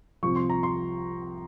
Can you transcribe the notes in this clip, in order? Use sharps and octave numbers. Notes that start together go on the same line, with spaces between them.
C2 C3 F3 C#6
C6
A#5
C6